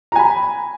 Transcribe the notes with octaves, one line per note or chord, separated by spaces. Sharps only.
G#5 A#5 B5